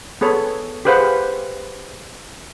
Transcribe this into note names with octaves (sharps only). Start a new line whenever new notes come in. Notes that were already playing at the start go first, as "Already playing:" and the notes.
B3 G#4 A4 C#5 B5
G4 G#4 B4 C5 F5 F#5